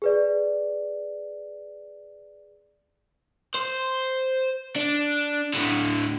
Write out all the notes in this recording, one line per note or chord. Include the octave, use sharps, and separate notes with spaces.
G#4 B4 D5
C5
D4
A2 D3